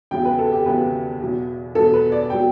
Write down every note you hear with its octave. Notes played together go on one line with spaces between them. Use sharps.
E2 C#3 F#3 G5
B4
A4
G4
E2 C#3 F#3 B4
E2 B2 F#3
E2 B2 F#3 A4
B4
D5
B2 F#3 G5